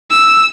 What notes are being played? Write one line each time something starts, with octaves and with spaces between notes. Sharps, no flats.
E6